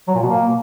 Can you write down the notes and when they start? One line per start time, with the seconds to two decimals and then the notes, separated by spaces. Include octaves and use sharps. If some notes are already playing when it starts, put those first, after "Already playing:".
0.08 F#3
0.15 A#2
0.22 B2
0.29 A#3